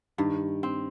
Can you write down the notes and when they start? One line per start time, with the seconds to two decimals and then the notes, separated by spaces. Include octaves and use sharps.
0.18 G2 D#3
0.63 C4